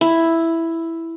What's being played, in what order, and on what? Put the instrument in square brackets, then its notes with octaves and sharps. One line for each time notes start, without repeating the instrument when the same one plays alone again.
[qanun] E4